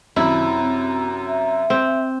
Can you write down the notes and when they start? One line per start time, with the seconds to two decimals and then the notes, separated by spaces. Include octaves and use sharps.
0.16 F#2 C3 D#3 E4
0.60 C4
1.26 E5
1.70 C4